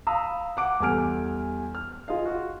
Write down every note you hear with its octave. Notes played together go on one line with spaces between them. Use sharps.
F5 A#5 B5 D#6 E6
F#5 D6 D7
E2 G3 A4 G#5 F6 D7
F6
F4 G#4 D#5 F5
F#4